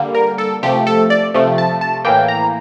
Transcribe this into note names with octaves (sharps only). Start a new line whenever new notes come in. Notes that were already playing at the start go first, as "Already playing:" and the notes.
Already playing: D3 G3 A#3
A#4
A4
C3 F3 A3 G4
A4
D5
C3 F3 A3
A5
A5
A2 E3 A#3 G5
A#5